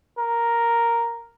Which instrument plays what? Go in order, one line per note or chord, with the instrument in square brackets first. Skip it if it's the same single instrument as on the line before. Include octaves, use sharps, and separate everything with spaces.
[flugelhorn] A#4